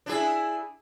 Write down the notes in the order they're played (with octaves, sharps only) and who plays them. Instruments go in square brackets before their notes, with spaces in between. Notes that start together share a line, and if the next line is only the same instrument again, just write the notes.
[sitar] D4 E4 G#4